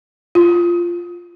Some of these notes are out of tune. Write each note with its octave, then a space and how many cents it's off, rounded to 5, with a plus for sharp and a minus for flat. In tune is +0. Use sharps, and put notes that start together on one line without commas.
F4 -5